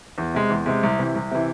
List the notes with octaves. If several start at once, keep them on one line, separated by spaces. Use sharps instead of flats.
E2
C3 G#3
E2
C3 G#3
C2
C3 E3
C2
C3 E3